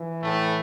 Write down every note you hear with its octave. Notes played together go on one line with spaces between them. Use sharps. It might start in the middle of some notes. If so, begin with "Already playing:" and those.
Already playing: E3
A2 A3